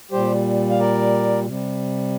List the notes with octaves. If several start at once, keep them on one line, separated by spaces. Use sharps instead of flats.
A#2 G3 G4 C5
F5
A#4 D5
C3 G3